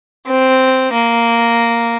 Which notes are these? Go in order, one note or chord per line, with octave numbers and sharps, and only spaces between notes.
C4
A#3